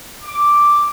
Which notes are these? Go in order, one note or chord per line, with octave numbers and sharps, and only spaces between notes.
D6